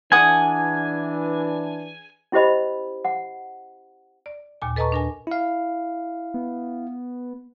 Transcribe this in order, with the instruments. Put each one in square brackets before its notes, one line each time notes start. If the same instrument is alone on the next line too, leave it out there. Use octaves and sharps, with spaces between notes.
[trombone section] E3 D4 [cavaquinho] G#4 F#5 D#6 [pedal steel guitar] G#5
[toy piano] C#4 E4 G4 C5 D#5 B5
F#5
[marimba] D5
D#2 A#2 G#5
A4 B4 D#5 A5 A#5 C#6
D4 A#4 G#5
[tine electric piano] E4 F5
[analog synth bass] B3